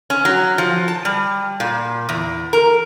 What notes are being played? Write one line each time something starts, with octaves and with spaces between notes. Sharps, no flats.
C#4
F#3
F3
A5
G3
A#2
E2
A#4